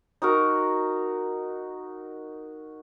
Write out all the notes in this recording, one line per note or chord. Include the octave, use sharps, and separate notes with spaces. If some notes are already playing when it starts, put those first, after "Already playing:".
D#4 F#4 A#4